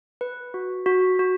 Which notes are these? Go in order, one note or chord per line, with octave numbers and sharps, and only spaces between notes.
B4
F#4
F#4
F#4